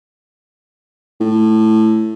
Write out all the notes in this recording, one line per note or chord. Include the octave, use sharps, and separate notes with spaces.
A2